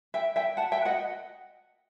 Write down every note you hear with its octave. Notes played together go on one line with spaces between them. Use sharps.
E5 G5
E5 G5
F#5 A5
E5 G5
D#5 F#5